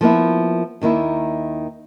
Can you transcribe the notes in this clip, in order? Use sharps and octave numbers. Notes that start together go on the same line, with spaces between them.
F3 A#3 B3 E4
D#2 D#3 A#3 E4